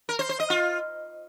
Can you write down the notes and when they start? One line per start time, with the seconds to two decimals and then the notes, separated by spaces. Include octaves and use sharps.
0.09 A#4
0.19 C5
0.29 C5
0.40 D#5
0.50 F4